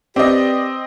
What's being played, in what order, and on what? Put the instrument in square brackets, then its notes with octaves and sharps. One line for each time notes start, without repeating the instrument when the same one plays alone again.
[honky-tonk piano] C4 D#5 [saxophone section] G4 B4 D5